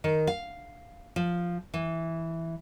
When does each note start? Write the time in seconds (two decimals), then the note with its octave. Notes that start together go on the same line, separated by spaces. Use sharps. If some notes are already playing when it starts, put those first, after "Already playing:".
0.04 D#3
0.27 F5
1.16 F3
1.74 E3